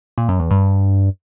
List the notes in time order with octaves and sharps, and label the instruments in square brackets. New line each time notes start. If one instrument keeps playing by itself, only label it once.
[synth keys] A#2
F#2
E2
G2